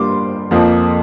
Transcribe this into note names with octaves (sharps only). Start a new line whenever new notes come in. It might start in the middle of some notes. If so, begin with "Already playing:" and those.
Already playing: G2 G3 A#3 C6 D6
F2 F3 A#3